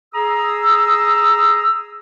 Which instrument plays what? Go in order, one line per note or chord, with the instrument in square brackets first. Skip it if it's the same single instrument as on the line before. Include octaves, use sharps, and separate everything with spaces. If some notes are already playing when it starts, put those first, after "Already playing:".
[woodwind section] G#4 A#5 D#6 E6